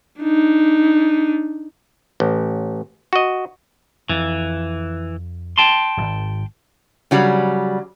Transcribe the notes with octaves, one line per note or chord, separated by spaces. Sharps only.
D4 D#4
A1
F#4 D#5
F2 E3
G5 A5 C6
D1 G#1
C#3 F#3 G3